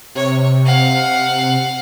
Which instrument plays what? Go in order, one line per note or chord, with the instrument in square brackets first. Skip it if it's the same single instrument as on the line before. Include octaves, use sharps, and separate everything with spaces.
[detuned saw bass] C3 [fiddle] C#5
[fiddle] F5 F#5